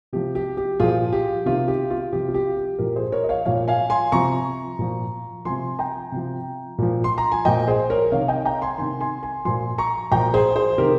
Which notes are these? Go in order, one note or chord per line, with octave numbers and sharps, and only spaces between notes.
C3 F3 G4
G4
G4
A#2 F3 F4 G#4
G4
C3 D#3 F4
G4
F4
C3 F3 G4
F4
G4
G4
A#2 F3 G4 A#4
G#4 C5
A#4 C#5
D#5
C#5 F5
A#2 F3 C#5 F5
F5 G#5
G#5 C6
C3 F3 A#5 C#6
A#2 F3
C3 F3 G#5 C6
G5 A#5
C3 F3
A#2 F3
C6
A#5
G#5
A#2 F3 D#5 G5
G#4 C5
A#4 C#5
C3 D#3 C#5 F5
D#5 G5
G5 A#5
G#5 C6
C3 D#3 G#5 C6
G#5 C6
G#5 C6
A#2 F3 G#5 C6
A#5 C#6
A#2 F3 G5 A#5
G#4 C5
G#4 C5
C3 D#3 G4 A#4